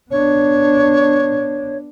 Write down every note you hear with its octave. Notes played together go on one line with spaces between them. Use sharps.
B3 D4 C#5